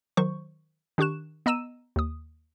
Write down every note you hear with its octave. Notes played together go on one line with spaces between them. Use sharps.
D#3 F#3 C5 C#6
D#3 D4 G4 C#6 F#6 E7
B3 D#5 A#5 E6 D#7 E7
D#2 D#6